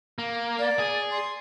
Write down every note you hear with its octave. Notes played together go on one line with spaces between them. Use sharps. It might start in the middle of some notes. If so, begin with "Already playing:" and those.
A#3
D5
G#4
C6